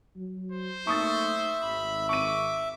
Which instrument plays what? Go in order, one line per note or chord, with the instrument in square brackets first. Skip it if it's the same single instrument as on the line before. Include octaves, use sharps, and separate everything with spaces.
[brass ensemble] F#3
[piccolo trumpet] C5
[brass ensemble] A3 A#3 D#4 [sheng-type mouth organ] E5 [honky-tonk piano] C#6 D#6 A6
[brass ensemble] G#1 [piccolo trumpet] B5
[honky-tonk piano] C#6 D#7 [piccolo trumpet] D6